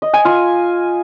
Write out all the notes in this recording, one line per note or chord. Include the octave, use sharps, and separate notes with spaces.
D#5
G#5
F4